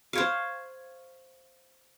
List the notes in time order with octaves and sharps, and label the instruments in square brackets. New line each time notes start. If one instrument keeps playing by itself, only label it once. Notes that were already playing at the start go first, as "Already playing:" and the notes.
[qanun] C5 C#5 F5